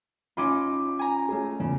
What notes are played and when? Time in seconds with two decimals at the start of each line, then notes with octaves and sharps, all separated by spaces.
0.37 C#4 D#4 F4 B5 D6
0.99 G#5 A#5
1.29 A3 C#4 G#4
1.60 E2 C#3